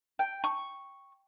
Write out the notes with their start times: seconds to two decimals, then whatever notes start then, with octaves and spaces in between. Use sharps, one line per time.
0.19 G5
0.44 C#6